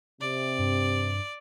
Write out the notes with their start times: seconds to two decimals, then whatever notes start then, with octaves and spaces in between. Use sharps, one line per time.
0.21 C3 D5
0.59 G2